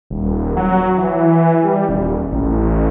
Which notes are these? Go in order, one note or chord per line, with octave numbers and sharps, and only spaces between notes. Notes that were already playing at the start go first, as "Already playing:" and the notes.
D#1
F#3
E3
G3
D#1
A1